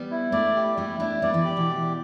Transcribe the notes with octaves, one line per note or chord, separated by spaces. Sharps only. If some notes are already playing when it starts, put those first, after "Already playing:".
Already playing: G3 B3
E4
A3 D4 D5
G4
G3 B3 E4
A3 D4 E4
G3 B3 D5
E3 A3
G4
B2 E3